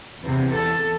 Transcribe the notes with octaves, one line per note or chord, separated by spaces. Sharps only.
E2 C3
A4